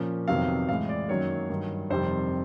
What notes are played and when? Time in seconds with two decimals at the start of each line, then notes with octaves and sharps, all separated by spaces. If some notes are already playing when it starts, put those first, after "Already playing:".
Already playing: A#2 F3 A#3 C#4
0.28 F2 C3 D#3 F#3 B3 F5
0.68 A2 E3 G#3 F5
0.89 D5
1.09 F#2 D#3 F#3 A#3 C#5
1.49 G2 D#3 F#3
1.90 F2 C3 D#3 G3 C5